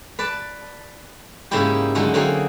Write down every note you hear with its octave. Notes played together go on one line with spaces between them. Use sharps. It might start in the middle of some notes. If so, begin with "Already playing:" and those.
B4 D5 A5
G#2 C#3 A#3 D#4 E4 G4
D3 F#3 G#3 A3 D#4
D3 F#3 A#3 C4 D#4 G#4